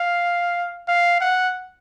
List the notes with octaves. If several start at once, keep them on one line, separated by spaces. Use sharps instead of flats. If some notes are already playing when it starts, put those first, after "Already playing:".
Already playing: F5
F5
F#5